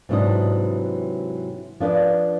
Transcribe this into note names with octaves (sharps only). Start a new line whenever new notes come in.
G#2 C3 E3 F#3 D4 D#5
F3 D4 B4 D5 D#5